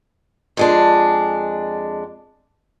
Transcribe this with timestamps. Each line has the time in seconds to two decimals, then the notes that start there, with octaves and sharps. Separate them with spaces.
0.57 F2 G#3 D4